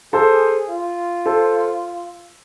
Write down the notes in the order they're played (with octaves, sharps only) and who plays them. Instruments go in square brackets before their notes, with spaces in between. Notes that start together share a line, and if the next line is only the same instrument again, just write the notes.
[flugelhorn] G#4 [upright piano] A4 C5
[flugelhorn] F4
[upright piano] A4 C5